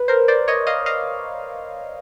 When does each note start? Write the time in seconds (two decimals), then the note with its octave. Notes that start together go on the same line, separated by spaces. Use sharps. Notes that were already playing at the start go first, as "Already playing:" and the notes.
Already playing: B4
0.08 A#4 C5
0.28 C5 D5
0.48 C#5 D#5
0.67 D#5 F5
0.86 D#5 F5